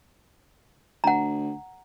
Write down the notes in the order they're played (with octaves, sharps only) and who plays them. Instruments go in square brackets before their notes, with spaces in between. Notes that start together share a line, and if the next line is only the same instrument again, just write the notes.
[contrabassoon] D2 [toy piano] F#5 A#5